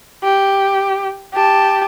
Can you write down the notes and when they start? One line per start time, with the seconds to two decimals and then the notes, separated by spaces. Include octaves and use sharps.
0.24 G4
1.33 G4 A5